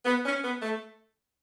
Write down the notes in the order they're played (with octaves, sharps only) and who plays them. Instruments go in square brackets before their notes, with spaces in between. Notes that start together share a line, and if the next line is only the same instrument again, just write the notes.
[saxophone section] B3
C#4
B3
A3